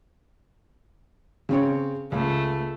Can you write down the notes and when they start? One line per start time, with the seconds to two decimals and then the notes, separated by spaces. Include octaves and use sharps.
1.49 C#3 C4 C#5
2.12 C#2 A3